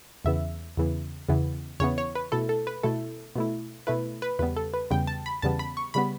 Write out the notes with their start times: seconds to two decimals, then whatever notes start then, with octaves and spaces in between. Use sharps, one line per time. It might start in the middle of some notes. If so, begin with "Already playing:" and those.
0.25 E2 C#3 E3 B3 E5
0.77 E2 C#3 E3 B3
1.29 E2 C#3 E3 B3
1.80 E2 C#3 E3 B3 C#5
1.98 C#5
2.15 B4
2.32 B2 A3 E4 A4
2.49 A4
2.67 B4
2.83 B2 A3 E4 A4
3.36 B2 A3 E4
3.87 B2 A3 E4 B4
4.22 B4
4.39 E2 C#3 G3 B3 B4
4.56 A4
4.74 B4
4.91 E2 C#3 G3 B3 G5
5.07 A5
5.26 B5
5.42 E2 C#3 G3 B3 A5
5.59 B5
5.77 C#6
5.94 C#3 G3 B3 B5